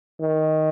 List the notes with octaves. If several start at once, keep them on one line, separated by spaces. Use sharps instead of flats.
D#3